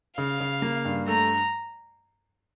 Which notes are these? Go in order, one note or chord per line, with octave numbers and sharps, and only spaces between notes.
C#3 F5
C#3
A#3
G2
A3 A#5